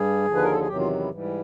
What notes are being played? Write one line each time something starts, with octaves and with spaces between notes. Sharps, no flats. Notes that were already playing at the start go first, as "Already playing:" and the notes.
Already playing: G2 G3 G#4
D#2 D3 F3
B4
A#4
A4
G#4
E2 C3 D#3 F#3 G4
F4
E4
G#2 E3 G3